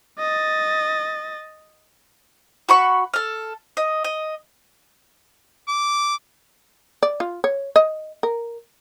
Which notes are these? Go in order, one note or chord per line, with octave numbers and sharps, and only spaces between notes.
D#5 A6
F#4 B5 C#6
A4 F6
D#5
D#5
D6
D5
F4
C#5
D#5
A#4